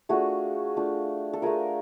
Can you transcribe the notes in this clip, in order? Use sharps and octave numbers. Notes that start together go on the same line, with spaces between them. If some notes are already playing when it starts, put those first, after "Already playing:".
A3 D4 F4 F#4 G#4
A3 D4 F4
A4
A3 D4 F4 G#4 A#4